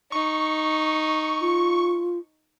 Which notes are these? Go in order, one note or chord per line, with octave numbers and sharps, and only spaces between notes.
D#4 C#6
F4